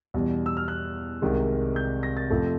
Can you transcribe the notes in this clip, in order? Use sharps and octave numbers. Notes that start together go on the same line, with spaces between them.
E2 B2 G3
E6
F6
F#6
C2 C3 D#3 G#3
G6
A#6
A6
F2 C3 F3 A3